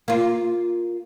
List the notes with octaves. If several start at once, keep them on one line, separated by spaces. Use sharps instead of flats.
A#3 F4